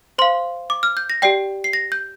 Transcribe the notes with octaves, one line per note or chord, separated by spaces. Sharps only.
C5 F5 C6
D6
F6
G6
A#6
G4 D5 G5 C7
C7
A#6
G6